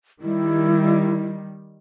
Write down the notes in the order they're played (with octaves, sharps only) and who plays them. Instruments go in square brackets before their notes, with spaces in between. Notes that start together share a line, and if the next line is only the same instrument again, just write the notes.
[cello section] D#3 G3 [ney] E4